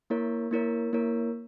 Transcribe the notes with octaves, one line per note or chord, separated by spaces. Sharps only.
A#3 E4 A#4 C#5
A#3 E4 A#4 C#5
A#3 E4 A#4 C#5